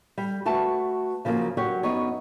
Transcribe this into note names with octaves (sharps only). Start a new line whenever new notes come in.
G3
A3 F#4 B4 A5
C#3 F3 F#3 A#3
F#3 G4 C#5 F#5
F#2 B3 D#4 C#5